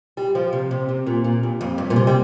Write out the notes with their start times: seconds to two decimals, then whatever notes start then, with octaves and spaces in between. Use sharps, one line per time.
0.17 G3
0.35 F3
0.53 C3
0.71 C3
0.89 C3
1.06 A#2
1.24 A#2
1.43 G2
1.61 F2
1.78 G2
1.90 A#2
1.96 C3
2.07 G3